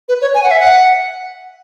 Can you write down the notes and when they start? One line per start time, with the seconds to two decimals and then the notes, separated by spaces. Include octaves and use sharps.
0.09 B4
0.22 C#5
0.34 G#5
0.44 F#5
0.51 E5
0.60 F#5